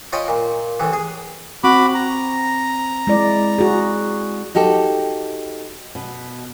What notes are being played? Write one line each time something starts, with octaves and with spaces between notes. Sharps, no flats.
F4 C#5 D#5 G5 G#5 B5
A#2
C2 A2 E3
G#4
C4 F#4 B5 D6
A#5
G#3 E4 D5
F#4 G#4
D#4 F#4 G4 A4
B2